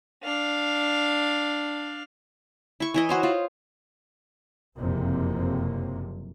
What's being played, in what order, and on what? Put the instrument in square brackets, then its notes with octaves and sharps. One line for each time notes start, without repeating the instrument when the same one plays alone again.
[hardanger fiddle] D4 F5
[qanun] E4 C#6
E3 E4 D#5
F#4 C5 C#5
F4
[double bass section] F#1 F2 C3 A#3